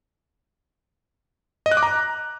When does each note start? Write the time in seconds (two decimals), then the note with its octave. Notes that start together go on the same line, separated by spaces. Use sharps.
1.66 D#5
1.71 F#6
1.77 D6
1.83 A#5